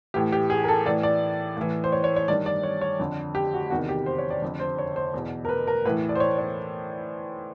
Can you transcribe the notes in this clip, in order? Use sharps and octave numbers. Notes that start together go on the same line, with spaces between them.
A2 E3 G4
G4
G#4
A#4
A4
A2 E3 D5
D5
A2 E3
C5
C#5
C#5
C#5
G2 D#3 D5
D5
C#5
C#5
F2 D3
G4
F#4
E2 C3 D#3 F#4
G4
C5
C#5
D5
F2 D3
C5
C#5
C5
E2 B2
A#4
B4
A#4
A2 E3 B4
D5
C5
C#5
C#5